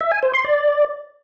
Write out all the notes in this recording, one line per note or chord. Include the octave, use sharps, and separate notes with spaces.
E5
G#5
C5
C6
D5